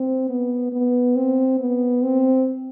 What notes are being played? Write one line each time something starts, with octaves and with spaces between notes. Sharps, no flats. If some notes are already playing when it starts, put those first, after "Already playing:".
Already playing: C4
B3
B3
C4
B3
C4